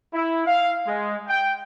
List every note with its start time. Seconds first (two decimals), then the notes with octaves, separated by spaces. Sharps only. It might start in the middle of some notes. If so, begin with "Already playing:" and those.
0.13 E4
0.45 F5
0.86 G#3
1.28 G5